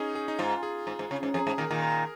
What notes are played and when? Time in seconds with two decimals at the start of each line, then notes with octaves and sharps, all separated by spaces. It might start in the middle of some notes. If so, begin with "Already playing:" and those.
Already playing: C#4 D#4 G#4
0.15 G#4
0.28 D#4
0.39 G#2 F4
0.63 G#4
0.87 G#2
0.99 G#2
1.11 C#3
1.23 G#2
1.34 F2 G#4
1.47 G#2
1.58 A#2 D#3 A#4
1.71 A#2 D#3
1.82 A#4